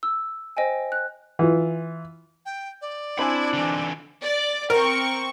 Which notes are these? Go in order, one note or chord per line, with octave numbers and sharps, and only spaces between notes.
E6
C5 D#5 G5 G#5
F#6
E3 F4
G5
D5
C4 D4 E4 G#5 B5
D3 E3
D5
C4 A#4 C#6